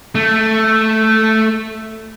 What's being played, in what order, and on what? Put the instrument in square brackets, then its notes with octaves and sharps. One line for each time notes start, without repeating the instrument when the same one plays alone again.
[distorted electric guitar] A3